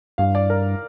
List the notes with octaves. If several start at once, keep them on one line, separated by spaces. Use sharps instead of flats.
G2 F5
D5
A#4